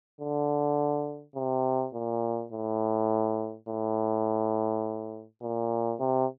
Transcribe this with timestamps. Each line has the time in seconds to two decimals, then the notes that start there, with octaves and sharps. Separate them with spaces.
0.20 D3
1.35 C3
1.93 A#2
2.52 A2
3.68 A2
5.42 A#2
6.00 C3